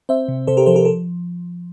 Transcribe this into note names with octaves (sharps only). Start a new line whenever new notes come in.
C4 C5 E5
C3
C3 A4 C5
G4 A#4
F3 A4 C5
G4 A#4
A4